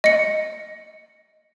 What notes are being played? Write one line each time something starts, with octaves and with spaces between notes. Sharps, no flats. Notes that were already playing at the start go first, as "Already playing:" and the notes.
D#5 C#7